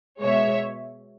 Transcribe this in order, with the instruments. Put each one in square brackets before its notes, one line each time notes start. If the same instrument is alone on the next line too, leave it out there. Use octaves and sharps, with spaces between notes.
[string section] B2 G#3 C#5 E5